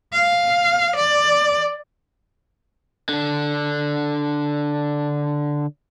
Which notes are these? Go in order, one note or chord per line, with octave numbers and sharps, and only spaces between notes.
F5
D5
D3 D4